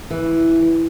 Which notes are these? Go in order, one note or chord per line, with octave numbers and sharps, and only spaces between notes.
E3